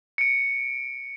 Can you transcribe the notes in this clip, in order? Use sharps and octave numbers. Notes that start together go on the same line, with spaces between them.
C#7 D7